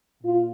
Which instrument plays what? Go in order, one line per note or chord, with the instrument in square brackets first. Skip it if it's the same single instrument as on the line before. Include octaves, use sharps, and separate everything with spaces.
[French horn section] A#2 F4